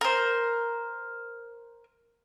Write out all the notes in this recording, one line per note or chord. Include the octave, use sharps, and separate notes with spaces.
A#4 C5